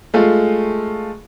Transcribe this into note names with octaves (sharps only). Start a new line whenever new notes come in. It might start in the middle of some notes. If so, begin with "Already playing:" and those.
G#3 A3 F4